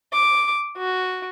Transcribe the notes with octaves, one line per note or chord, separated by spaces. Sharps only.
D6
F#4